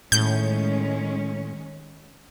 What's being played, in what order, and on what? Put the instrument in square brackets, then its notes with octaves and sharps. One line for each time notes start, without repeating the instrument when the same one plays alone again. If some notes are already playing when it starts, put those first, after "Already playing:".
[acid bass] A2 [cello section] D#3 G#3 C#4 [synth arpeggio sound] G6